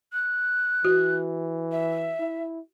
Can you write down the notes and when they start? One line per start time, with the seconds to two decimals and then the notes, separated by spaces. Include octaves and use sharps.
0.13 F#6
0.85 E3 F#4
1.72 E5
2.20 E4